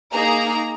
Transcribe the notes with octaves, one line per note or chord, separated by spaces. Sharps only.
A#3 D#4 G#4 A#5